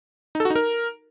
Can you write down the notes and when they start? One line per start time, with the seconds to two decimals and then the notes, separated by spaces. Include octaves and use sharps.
0.35 D#4
0.40 A4
0.45 F#4
0.50 D#4
0.56 A#4